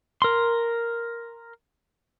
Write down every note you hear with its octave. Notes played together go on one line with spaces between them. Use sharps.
A#4 C6